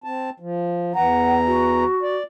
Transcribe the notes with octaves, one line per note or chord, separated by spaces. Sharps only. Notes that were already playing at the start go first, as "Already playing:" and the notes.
C4 A5
F3
E2 E3 F#5 A#5
F#4
D5